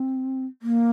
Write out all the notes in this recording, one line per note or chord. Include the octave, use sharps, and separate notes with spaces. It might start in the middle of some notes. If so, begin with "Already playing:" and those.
Already playing: C4
A#3